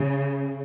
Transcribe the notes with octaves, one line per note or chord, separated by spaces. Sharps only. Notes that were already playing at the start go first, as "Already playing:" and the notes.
Already playing: C#3